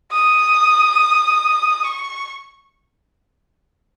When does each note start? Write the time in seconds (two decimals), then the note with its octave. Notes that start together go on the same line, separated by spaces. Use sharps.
0.12 D#6
1.84 C#6